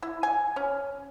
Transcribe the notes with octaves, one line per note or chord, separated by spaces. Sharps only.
E4
G#5
C#4